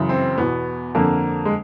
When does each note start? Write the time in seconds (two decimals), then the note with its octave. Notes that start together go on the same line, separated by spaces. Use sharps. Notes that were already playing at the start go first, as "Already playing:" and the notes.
Already playing: F#2 C#3 E3
0.09 C4
0.38 E2 B2 B3
0.95 F2 D3 A#3
1.45 G#3